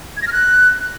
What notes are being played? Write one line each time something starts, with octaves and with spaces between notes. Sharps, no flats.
G#6
A#6
F6
F#6